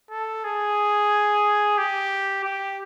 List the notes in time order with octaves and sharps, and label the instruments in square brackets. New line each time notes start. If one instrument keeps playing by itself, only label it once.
[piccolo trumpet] A4
G#4
G4
G4